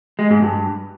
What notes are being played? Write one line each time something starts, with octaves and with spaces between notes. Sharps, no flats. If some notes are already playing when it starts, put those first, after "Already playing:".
G#3
G#2
G2